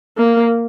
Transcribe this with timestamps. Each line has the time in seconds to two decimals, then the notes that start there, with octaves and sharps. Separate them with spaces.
0.17 A#3